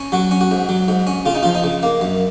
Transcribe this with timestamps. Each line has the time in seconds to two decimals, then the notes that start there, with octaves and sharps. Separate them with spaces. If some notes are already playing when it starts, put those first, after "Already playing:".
Already playing: C#4
0.12 F#3 F#4
0.31 C#4
0.41 F#4
0.51 G#2
0.69 F#3
0.88 G#2
1.07 C#4
1.26 C#3 F4
1.35 D#4
1.43 F3 F4
1.55 D#4
1.64 C#3
1.83 A#3
2.01 F#2